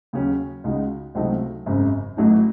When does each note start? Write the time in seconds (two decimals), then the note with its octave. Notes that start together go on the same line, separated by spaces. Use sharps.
0.13 D#2 C#3 F#3 C#4
0.64 C#2 C#3 G#3 D#4 F#4
1.15 C#2 C3 F#3 A3 D#4
1.66 G#1 F#2 C#3
2.17 A1 A2 F#3 A3 D#4